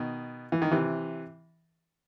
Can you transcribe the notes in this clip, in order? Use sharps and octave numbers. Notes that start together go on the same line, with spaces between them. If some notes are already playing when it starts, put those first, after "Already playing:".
Already playing: B2 D#3
E3
D#3
C3 E3